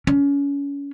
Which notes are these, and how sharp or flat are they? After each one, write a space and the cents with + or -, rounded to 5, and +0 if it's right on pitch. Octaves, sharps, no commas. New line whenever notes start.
C#4 +30